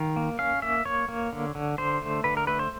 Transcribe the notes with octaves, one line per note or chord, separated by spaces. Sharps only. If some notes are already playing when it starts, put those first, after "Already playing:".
Already playing: D#3 F5
A#3
C#4 F5
A#3 E5
A#3 C#5
A#3
D3
D3
D3 C5
A3
D3 B4
A#4
A3 B4
C5